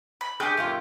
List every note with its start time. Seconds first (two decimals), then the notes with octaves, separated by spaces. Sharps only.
0.21 B5
0.40 A3 D4 G4 G#4 G6
0.57 F#2 A#2 F4